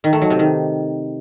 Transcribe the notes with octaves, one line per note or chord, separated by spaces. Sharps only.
D#3
A3
F#3
C3
D#3